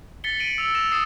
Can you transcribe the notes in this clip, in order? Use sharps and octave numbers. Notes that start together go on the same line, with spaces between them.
A6 B6 C#7 G7
D7 D#7 F#7
E6 F7
A#6 E7
D#6 A6 C7 E7